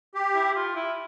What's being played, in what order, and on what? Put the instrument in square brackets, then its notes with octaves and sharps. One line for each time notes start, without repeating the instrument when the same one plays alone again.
[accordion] G4
[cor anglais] E4
F4
E4